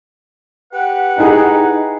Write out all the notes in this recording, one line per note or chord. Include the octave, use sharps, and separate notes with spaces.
G4 B4 F#5
D#4 E4 G#4